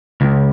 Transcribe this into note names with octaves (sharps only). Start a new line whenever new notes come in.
C#2